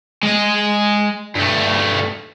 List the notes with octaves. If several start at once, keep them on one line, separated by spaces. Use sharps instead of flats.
G#3 D#5
G2 A3